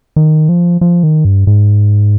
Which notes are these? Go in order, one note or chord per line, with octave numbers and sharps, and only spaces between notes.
D#3
F3
F3
D#3
G2
G#2